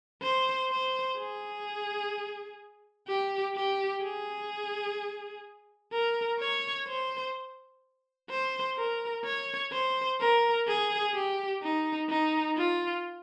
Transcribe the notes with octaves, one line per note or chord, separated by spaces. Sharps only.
C5
C5
G#4
G4
G4
G#4
A#4
C#5
C5
C5
A#4
C#5
C5
A#4
G#4
G4
D#4
D#4
F4